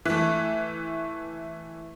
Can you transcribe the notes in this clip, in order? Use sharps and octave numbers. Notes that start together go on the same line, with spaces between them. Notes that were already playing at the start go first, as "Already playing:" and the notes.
E3 A3